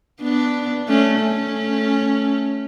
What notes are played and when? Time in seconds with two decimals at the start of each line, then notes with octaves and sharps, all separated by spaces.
0.21 B3 D4
0.88 A3 C#4
1.21 A3 C#4